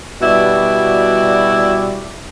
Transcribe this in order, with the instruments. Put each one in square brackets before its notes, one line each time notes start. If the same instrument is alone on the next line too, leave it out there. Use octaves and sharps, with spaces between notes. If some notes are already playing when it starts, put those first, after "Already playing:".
[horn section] B2 G3 E4 F#4 D5